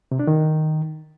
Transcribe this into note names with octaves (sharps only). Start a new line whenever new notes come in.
C3
D4
D#3